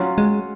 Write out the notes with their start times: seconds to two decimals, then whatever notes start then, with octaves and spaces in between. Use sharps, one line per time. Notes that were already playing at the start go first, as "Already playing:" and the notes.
Already playing: F#3 C#4 F4
0.18 G#3